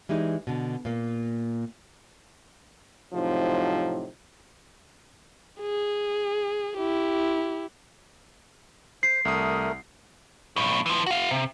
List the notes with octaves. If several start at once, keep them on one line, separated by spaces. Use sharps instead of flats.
E3 G3 G#3 D#4
B2 D3
A#2 A#3
A2 C3 F3 F#3 C4 D#4
G#4
E4 G4
C5 C7
C2 A3 A#4 D#6
B1 A2
E3 F3
F#4 F5
C3